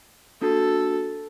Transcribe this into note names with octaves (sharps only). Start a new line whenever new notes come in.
A#3 D4 F#4 A4